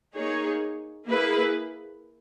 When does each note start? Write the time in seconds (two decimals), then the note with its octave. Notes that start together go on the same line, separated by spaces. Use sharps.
0.15 A#3 D#4 G#4 C#5
1.07 A#3 E4 G#4 B4